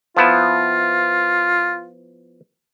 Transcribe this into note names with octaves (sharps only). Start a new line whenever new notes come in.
F3 B3 E4 F4